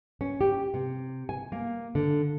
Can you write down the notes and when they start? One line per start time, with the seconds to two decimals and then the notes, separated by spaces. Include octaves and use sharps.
0.21 C#4
0.41 G4
0.74 C3
1.29 G#5
1.52 A#3
1.95 D3